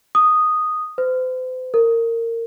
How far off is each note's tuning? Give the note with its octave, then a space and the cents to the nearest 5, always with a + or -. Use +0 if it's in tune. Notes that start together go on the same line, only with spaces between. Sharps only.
D#6 -5
C5 -40
A#4 -25